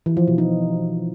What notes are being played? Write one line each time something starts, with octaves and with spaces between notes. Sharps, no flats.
E3
F3
B2
D#4